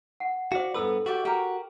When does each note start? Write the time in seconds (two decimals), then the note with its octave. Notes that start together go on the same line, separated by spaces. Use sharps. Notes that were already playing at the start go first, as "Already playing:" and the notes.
0.20 F#5
0.52 F#4 C5 D5 F5
0.74 G2 B3 E4 A4 B4 E6
1.06 F#4 G4 D5 E5
1.25 F#4 G4 A#4